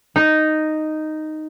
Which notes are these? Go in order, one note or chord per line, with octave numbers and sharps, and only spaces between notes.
D#4